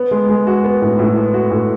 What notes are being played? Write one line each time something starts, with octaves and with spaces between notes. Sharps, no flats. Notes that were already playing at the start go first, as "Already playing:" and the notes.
Already playing: B3
G#3
G#3
F#4
B3
A2
A2
B3
F#4
A2